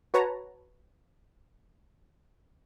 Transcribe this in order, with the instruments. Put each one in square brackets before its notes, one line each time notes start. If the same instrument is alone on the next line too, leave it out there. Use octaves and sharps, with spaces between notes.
[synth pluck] F#4 B4 C#5 A5 A#5